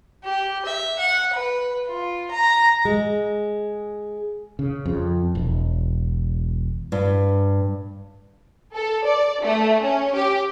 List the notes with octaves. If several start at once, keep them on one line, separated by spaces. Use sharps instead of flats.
G4
E5
F#5
B4
F4
A#5
G#3
C#3
F2
E1
G2
A4
D5
A3
C#4
G4